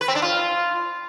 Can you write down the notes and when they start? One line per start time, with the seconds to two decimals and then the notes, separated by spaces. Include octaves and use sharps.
0.01 B4
0.08 C4
0.15 D4
0.22 F4